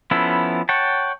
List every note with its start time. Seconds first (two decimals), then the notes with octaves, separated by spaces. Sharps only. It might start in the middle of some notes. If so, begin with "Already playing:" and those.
0.11 F3 B3 C#4 E4 A4
0.69 C#5 F#5 G5 A5